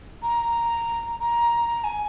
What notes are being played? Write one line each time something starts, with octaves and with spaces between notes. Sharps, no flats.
A#5
A#5
G#5